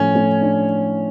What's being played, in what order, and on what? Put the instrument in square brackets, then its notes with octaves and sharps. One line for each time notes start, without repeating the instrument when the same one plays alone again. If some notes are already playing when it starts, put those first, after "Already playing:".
Already playing: [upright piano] A2 F3 A3 [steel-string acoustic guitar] C#4
[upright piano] A3
D4